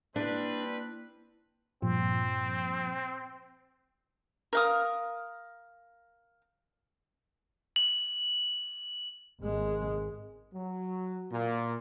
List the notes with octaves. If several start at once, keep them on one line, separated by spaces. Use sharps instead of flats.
G3 A#3 C4 D4 E4 B4
G2 A#2 F3 C4
A#4 F5 D#6
F#7
G#1 G#3
F#3
A#2